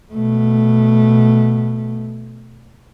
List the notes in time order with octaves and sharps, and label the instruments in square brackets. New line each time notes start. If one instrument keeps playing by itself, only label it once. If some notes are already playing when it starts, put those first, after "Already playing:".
[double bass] B2 A3